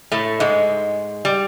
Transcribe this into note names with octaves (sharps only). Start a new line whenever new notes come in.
A2 A3
G#2 G#3
G3